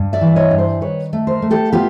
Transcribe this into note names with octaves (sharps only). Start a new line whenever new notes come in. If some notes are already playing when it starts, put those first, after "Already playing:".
Already playing: G2
D5 E5
E3
C#5 D#5
G2
C5 D5
D#3 B4 C#5
A3
A#4 C5
A3
G4 A4
B3 F4 G4